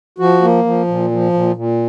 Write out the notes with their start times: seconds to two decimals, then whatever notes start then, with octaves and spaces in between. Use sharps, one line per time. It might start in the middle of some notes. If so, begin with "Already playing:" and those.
0.19 F3 F#4
0.42 A#3
0.65 F3
0.88 A#2
1.11 F3
1.33 A#2
1.56 A#2